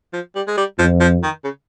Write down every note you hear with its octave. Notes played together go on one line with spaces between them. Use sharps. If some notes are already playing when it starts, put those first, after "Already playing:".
F3
G3
G#3
G3
F2 F3
F3
D#3
C#3